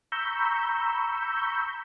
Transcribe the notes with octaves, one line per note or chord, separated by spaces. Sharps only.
A#5 B5 C#6 E6 G6